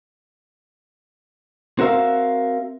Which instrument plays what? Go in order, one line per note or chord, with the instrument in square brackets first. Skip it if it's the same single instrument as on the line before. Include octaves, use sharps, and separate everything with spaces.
[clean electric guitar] C4 F#4 A#4 E5 F5